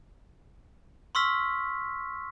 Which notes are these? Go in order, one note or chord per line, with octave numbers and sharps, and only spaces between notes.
C6 C#6 E6 F6 B6